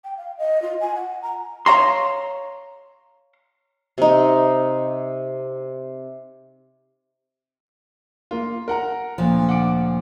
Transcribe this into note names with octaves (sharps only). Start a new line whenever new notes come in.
G5
F5
D#5
F4
G#5
F#5
A#5
C#5 F5 A#5 C6
C3 D#4
A#3 F4
A#4 F#5 A#5
D2 A#2 F3
F#5 D6 D7